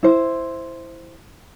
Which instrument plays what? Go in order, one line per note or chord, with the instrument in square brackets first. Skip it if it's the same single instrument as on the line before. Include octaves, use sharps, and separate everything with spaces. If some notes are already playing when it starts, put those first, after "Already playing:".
[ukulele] E4 C5